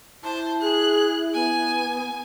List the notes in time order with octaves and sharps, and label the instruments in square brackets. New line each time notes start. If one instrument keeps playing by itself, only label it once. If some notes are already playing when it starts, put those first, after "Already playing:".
[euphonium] E4 [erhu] C5 [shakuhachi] A5
[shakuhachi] G#4 [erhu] F#6
[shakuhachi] B3 [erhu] G#5